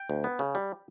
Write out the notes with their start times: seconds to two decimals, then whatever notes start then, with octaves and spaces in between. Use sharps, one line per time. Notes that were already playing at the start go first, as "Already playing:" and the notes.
Already playing: G5
0.10 D2
0.24 B3
0.39 C#3
0.55 G3